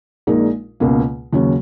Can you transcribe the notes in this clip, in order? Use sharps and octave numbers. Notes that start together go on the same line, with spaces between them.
A#1 A#2 G#3 D#4 A#4
C#2 B2 A#3
D#2 C#3 F#3 C#4 F#4